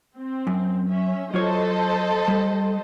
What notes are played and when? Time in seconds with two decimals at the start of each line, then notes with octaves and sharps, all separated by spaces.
0.17 C4
0.47 F#2
0.89 C#4 E5
1.34 F#3 F4 A4 C5 C#5 D#5
2.28 G3